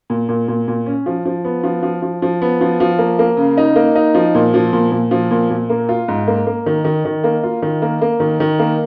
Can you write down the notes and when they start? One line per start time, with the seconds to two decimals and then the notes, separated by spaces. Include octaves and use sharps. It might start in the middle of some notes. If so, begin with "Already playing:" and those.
0.10 A#2
0.29 A#2
0.48 A#2
0.68 A#2
0.86 C#4
1.06 F3
1.26 F3
1.45 B3
1.64 F3
1.83 F3
2.02 F3
2.22 F3
2.42 B3
2.61 F3
2.80 F3
2.99 A#3
3.19 A#3
3.37 C#3
3.57 D#4
3.76 A#3
3.95 D#4
4.15 F3
4.35 A#2
4.54 F3
4.73 A#2
4.92 A#2
5.11 F3
5.31 A#2
5.50 A#2
5.70 A#3
5.89 F4
6.08 G#2
6.27 A#3
6.47 A#3
6.66 D#3
6.85 D#3
7.05 D#3
7.24 A#3
7.43 F4
7.62 D#3
7.82 A#3
8.02 A#3
8.20 D#3
8.40 D#3
8.59 A#3